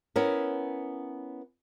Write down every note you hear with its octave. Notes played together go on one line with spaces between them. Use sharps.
B3 C#4 E4 A#4